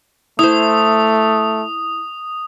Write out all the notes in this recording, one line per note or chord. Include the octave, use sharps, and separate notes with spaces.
A3 E4 C5 D#6